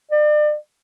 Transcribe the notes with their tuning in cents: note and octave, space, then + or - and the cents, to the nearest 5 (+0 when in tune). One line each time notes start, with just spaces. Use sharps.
D5 +35